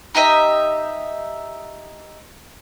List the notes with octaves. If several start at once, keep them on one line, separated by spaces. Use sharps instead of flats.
D#4 G4 D#5 E5